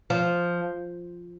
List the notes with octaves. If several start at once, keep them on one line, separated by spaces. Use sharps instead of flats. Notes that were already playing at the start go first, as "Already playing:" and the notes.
F3